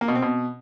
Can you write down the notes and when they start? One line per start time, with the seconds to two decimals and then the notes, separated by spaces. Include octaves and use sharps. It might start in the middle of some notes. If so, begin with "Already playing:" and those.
0.01 A#3
0.08 B2
0.15 C4
0.22 B2